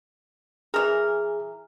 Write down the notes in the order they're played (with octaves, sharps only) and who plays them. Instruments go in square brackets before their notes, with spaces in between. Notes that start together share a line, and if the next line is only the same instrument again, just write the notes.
[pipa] E3 A#4 [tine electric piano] G#4